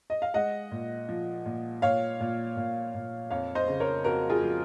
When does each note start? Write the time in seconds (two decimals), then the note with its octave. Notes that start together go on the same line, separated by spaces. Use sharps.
0.10 D#5
0.22 F5
0.34 G#3 D#5 F#5
0.71 A#2
1.09 F3
1.45 A#2
1.82 A#2 C#5 F5
2.20 A#2
2.57 A#2
2.94 A#2
3.30 F2 C#5 F5
3.55 C5 D#5
3.67 C#3
3.80 A#4 C#5
4.04 F2 F#4 A#4
4.29 F4 G#4
4.42 F3